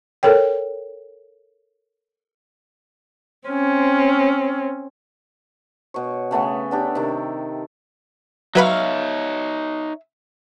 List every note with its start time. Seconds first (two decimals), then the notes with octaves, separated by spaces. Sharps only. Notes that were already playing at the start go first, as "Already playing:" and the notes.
0.23 A4 A#4 C#5 G5
3.49 C4 C#4
5.94 B2 C#5
6.31 C#3 A3 B3 C#4
6.71 B3 D4 G4
6.95 C3 D#3
8.55 F#3 D#4 B4 C#5 E5 F5 B5